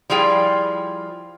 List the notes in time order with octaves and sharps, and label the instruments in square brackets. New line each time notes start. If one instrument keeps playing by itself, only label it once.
[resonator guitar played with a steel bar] F3 G3 E4 F4 G#4 G5